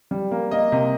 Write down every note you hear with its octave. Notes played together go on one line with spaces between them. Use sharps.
G3
A#3
A#3 D#5
C3